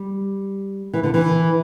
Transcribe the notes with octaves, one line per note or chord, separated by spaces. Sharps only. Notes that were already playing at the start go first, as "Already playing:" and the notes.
Already playing: G3
E3
D3
E3